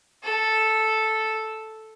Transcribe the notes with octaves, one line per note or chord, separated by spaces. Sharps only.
A4